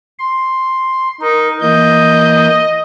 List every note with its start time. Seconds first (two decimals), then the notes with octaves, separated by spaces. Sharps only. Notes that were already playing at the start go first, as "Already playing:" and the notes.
0.19 C6
1.21 D#4 A#4
1.61 E3 A#3 D#5 G6